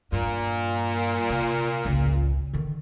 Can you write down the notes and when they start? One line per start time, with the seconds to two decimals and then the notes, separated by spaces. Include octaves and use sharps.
0.12 G2 A#2
1.30 C3
1.85 G#1 C#2
2.53 D3 D#3